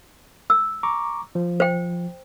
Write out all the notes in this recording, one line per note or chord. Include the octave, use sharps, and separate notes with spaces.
E6
A#5 C#6 D6
F3
C5 G5